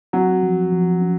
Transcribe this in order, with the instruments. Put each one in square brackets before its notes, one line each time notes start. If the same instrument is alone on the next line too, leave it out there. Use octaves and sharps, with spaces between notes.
[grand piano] F#3 [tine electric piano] C4
[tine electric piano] F3
F3
C#4